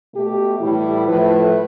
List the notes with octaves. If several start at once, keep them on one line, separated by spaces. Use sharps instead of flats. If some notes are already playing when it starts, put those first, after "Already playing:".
B2 A3 G4
A2 E3 G3 E4
A2 F3 A3 B4